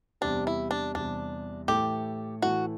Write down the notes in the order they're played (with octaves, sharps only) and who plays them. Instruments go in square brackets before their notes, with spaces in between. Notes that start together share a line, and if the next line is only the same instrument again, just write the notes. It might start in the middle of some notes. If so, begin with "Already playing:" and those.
[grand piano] E2 C3 G3 [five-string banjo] D4
[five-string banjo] E4
D4
[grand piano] E2 C3 G3 [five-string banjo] D4
[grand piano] A2 E3 A3 E4 A4 [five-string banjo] G4
[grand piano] A2 E3 A3 E4 A4 [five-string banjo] F#4